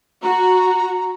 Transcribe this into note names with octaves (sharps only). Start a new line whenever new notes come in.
F#4 A#5